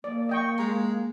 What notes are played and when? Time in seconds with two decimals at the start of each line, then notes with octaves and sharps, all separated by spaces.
0.04 A#3 D5
0.29 D#5 G5 C#6
0.59 G#3 A#5